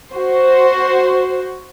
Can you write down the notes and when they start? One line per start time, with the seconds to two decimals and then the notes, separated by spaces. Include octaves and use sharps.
0.14 F#4 C5